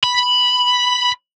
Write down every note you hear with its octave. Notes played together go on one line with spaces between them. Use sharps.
B5